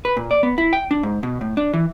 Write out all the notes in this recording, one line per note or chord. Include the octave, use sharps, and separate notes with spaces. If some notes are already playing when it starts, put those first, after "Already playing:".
B4
A#2
D5
B3
E4
G5
D4
G#2
B2
A2
D4
E3